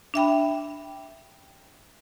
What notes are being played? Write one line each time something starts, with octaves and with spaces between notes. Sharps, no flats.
D4 E5 G5 B5